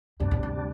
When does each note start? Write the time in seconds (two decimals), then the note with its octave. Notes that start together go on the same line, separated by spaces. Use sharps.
0.20 D2 G2 C3 G3 D4
0.31 A2
0.43 G2